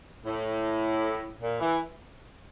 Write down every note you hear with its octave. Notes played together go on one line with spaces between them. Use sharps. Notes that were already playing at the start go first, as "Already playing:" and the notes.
A2
A#2
E3